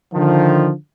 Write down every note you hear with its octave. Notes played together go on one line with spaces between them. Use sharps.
D3 D#3 F3